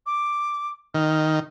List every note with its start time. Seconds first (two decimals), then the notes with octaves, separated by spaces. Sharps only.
0.06 D6
0.95 D#3 F6